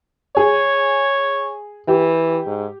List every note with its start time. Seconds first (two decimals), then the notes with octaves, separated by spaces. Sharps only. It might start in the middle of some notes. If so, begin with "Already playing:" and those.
0.37 G#4 C#5
1.88 E3 G4
2.46 G#2